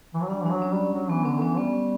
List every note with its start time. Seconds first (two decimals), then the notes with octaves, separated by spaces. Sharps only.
0.14 E3
0.22 F#3
0.29 G3 D4
0.43 E3 D4
0.51 F#3
0.62 C#4
0.73 G3
0.94 F#3
1.09 E3 B3
1.25 D3 C#4
1.42 E3 C#4
1.57 G3 B3
1.73 C#4